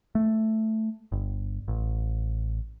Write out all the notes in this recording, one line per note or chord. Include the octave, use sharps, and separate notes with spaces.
A3
G1
A1